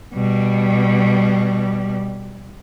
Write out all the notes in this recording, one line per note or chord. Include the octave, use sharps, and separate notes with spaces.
B2 G3